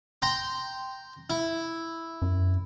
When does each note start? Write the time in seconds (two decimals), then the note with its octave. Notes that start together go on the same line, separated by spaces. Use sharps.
0.22 G5 A#5 C6
1.30 E4
2.22 F#2